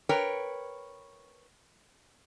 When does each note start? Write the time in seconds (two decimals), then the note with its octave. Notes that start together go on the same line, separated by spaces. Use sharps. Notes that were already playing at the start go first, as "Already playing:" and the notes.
0.09 A#4 B4 C#5 G5